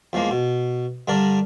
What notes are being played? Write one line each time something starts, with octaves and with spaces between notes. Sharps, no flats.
E2 F3 G#3 A#3
B2
G2 D3 D4 A#4 D5